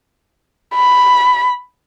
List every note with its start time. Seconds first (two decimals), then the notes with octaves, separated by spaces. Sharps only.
0.74 B5